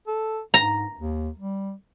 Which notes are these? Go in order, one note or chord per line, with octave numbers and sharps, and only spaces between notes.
A4
G#2 A#5
D#2
G3